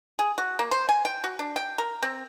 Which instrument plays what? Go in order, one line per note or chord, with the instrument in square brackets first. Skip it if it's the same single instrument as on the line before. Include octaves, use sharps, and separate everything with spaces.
[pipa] G#4
F#4
A#3
C5
G#5
G5
F#4
D4
G5
A#4
C4